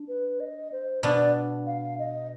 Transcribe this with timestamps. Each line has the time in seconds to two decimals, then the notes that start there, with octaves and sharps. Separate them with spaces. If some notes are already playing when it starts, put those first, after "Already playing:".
Already playing: D4
0.08 B4
0.40 D#5
0.72 C5
1.03 B2 B3 D4 D5
1.66 F5
1.99 D#5